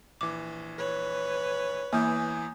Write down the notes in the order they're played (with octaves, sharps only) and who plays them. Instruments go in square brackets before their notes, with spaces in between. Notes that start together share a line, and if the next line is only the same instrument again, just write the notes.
[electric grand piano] A#1 E3 [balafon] D6
[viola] B4 C#5
[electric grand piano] E2 E3 [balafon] A#3 [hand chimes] G#5 D#6 G6